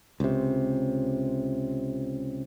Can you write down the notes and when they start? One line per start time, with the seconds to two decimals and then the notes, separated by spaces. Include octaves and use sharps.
0.20 C#2 C3